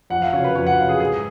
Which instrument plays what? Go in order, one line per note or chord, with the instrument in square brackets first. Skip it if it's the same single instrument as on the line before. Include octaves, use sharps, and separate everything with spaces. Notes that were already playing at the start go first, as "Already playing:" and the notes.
[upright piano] F2 [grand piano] F#5
[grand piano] F5
[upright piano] C#3 F#3 [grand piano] C#5
[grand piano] B4
[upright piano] F2 [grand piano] C#5
[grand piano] F#5
[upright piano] C#3 F#3 [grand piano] F5
[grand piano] G#4
[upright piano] G#2 [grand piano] G#4